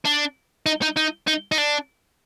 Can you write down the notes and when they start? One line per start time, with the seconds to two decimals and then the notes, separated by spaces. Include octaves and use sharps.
0.05 D4
0.66 D#4
0.82 D#4
0.96 D#4
1.27 D#4
1.52 D#4
1.58 D4